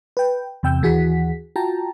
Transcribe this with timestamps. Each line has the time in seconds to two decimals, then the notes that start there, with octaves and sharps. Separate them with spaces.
0.17 B4 G5
0.63 E2 C3 G5 E6 G6
0.82 D#2 E3 F#4 G#4 F#5 B6
1.56 F4 F#4 G5 A5 A#5